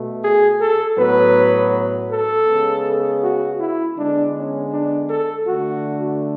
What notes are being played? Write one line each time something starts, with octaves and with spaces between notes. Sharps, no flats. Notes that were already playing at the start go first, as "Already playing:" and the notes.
Already playing: B2 A3
G#4
A4
A2 F#3 B3 B4
A4
C#3 G#3 B3
F#4
E4
D3 G#3 B3 D4
C#4
D4
A4
D3 A3 F#4